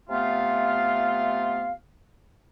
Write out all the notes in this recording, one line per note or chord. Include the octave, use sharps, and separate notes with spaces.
C3 A3 B3 F4 F5